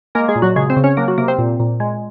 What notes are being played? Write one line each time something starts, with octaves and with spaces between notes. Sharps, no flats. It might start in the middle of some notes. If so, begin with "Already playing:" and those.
G#3 A#3 A#4
G#3 G#4
A#2
F#3 F#4
C#3 G#3 G#4
C4 C5
C#3
C#4 C#5
F#3 A#3 A#4
F#3 F#4
C3 A#3 A#4
C4 C5
A#2
A#2
G#3